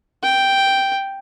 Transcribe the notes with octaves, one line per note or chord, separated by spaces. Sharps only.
G5